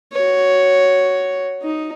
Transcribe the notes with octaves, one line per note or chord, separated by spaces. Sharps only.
F#4 C#5
D#4